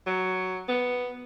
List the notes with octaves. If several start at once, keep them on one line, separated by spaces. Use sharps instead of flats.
F#3
B3